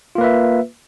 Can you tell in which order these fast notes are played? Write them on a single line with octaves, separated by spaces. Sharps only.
F4 A#3 B4 E5